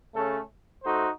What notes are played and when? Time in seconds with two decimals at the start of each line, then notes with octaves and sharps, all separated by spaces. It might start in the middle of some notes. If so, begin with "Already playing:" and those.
0.14 C#3 A3 C#4 A4
0.83 A3 D#4 F#4 C5